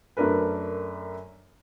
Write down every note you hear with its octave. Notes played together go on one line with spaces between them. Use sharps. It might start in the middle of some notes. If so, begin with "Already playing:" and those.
F#2 A3 D4 A#4 B4